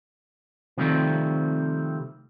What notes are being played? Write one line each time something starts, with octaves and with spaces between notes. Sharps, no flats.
C3 D#3 F3 G3 A3 C4